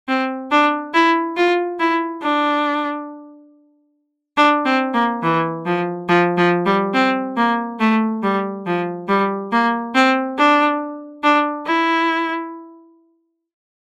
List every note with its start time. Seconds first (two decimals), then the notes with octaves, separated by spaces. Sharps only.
0.08 C4
0.51 D4
0.94 E4
1.37 F4
1.80 E4
2.22 D4
4.37 D4
4.65 C4
4.94 A#3
5.23 E3
5.66 F3
6.09 F3
6.37 F3
6.66 G3
6.94 C4
7.37 A#3
7.80 A3
8.23 G3
8.66 F3
9.08 G3
9.52 A#3
9.95 C4
10.38 D4
11.23 D4
11.66 E4